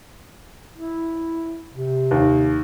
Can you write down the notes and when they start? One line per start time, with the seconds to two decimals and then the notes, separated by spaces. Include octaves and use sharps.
0.76 E4
1.73 C3
2.11 D#2